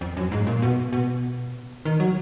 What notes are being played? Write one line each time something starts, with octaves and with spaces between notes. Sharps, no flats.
F2
F#2
G#2
A#2
B2
B2
D#3
F#3